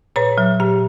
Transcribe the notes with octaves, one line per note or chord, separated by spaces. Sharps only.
A#2 B4 C#5
F#3
A#2 G4